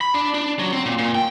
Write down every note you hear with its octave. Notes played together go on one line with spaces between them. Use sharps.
B5
D4
D4
F#3
C4
A#2
A#2
G5